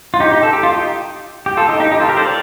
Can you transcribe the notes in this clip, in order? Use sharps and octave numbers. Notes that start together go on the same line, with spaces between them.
F4
D#4 G4
D#4 G4
A4
G4
F4
D#4 G4
G4
F4 A4
D#4 G4
D#4 G4
D#4 G4
F4 A4
G4 A#4
A4 C5
A#4 D5